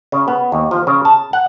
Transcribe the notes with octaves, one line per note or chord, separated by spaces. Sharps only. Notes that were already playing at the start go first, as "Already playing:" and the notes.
C#3
B3
D#2
F3
C#3
A5
F#5